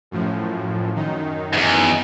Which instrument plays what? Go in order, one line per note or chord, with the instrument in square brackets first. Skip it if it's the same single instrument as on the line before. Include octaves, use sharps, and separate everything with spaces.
[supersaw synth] F#2 A2 F3
F#2 D#3 D#4
[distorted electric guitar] E2 G#2